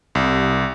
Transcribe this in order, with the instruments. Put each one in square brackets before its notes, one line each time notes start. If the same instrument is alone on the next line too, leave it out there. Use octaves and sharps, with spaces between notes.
[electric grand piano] C2